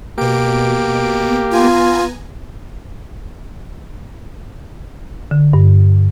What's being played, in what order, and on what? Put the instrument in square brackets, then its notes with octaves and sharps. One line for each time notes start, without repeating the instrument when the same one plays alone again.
[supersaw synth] B2 D7 [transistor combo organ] A#3 G4
[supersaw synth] B3 G#5 A#5 [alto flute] F4
[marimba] D3
G2